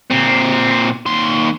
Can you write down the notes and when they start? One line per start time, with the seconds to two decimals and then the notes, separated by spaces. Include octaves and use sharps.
0.11 A#2 C4
1.06 D#2 C6